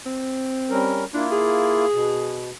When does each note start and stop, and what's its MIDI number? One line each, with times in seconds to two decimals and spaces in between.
0.06 1.01 60
0.70 1.05 55
0.70 1.05 61
0.70 1.05 70
1.14 1.85 58
1.14 1.26 62
1.14 1.85 64
1.14 1.85 65
1.32 2.56 68
1.93 2.51 47